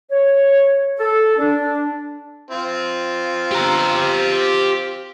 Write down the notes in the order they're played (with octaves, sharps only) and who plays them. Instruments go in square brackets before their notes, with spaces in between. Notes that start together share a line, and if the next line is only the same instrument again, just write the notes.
[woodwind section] C#5
A4
D4
[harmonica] C4 F4
[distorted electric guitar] G4 A#5